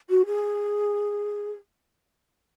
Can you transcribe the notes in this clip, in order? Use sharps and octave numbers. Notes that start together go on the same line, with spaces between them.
F#4
G#4